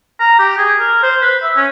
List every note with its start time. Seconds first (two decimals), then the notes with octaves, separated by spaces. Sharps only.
0.20 A#5
0.39 G4
0.58 G#4
0.79 A#4
1.03 C5
1.22 B4
1.43 E5
1.56 C#4